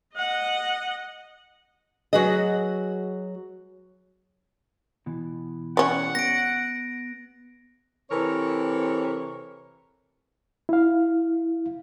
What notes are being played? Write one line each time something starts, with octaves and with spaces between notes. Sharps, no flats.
D#5 F#5
F#3 F#4 G#4 B4 D#5
B2 E3
G3 C#4 F#5
B3 A#6 D7
C3 E3 C4 A4 A#4 C#5
E4 F5